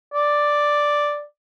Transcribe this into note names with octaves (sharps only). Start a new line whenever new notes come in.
D5